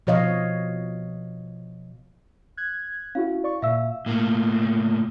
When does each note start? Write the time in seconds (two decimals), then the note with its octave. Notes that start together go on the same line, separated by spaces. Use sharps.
0.07 B2 F3 C#5 D#5 F5
2.57 F#6 G#6
3.15 C#4 E4 F#4 F5
3.44 D5 C#6
3.62 A#2 E5 F5 E6
4.06 A2 A#3